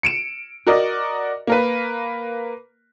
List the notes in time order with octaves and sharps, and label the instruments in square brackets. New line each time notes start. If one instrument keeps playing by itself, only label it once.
[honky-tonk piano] C#7 D7 E7
F#4 A#4 D5 D#5
A#3 A#4 B4